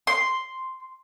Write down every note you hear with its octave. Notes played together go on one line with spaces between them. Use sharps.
C6